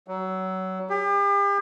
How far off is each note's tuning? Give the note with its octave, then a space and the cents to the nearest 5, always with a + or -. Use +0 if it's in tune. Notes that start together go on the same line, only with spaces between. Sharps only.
F#3 +25
G4 +40